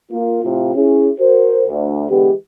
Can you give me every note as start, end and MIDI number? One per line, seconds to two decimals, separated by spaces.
0.11 0.40 58
0.11 0.40 65
0.44 0.75 45
0.44 0.75 48
0.44 0.75 65
0.75 1.11 61
0.75 1.11 64
0.75 1.11 68
1.20 1.64 66
1.20 1.64 70
1.20 1.64 72
1.68 2.07 38
2.09 2.31 50
2.09 2.31 52
2.09 2.31 56
2.09 2.31 59
2.09 2.31 67